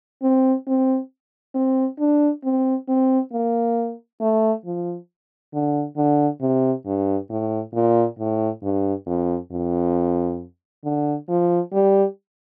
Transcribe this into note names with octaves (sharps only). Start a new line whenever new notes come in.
C4
C4
C4
D4
C4
C4
A#3
A3
F3
D3
D3
C3
G2
A2
A#2
A2
G2
F2
F2
D3
F3
G3